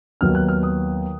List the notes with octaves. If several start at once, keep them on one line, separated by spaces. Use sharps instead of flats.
D#2 D#3 F#3 B3 D#4 F6
F#6
F6
D#6